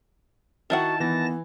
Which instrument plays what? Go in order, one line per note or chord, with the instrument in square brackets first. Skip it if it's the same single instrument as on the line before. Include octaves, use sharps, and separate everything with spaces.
[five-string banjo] D#3 E4 F#5 [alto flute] F#4 [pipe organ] A5
[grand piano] E3 [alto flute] B3 [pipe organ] A5 A#6